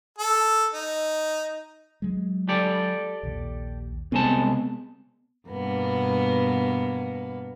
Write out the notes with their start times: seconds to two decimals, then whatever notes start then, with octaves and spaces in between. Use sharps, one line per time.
0.18 A4
0.73 D#4
2.02 F#3 G#3
2.49 G4 A4 D5
3.23 A#1 D#2
4.12 C2 G#3 B3 C4 A5
5.48 G2 B2 A#3 B3